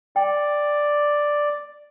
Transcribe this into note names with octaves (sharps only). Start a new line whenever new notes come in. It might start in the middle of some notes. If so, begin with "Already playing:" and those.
D5 G5